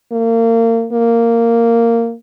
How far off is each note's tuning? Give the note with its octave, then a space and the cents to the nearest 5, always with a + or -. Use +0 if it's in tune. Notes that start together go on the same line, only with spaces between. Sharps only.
A#3 -30
A#3 -10